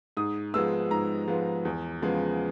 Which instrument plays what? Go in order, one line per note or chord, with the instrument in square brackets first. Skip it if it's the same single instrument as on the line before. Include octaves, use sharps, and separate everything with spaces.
[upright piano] G#2 D#6
F3 G#3 B3 E6
G#2 A#5
F3 G#3 B3
E2
C#3 F3 G#3 B3